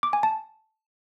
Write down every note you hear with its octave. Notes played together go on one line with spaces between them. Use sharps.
D6
G#5
A5